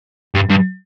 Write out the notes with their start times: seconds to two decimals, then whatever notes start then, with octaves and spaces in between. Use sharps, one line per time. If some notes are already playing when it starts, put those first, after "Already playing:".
0.35 G2
0.49 G2